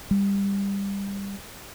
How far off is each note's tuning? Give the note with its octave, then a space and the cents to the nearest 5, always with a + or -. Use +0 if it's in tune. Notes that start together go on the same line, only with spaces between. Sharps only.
G3 +20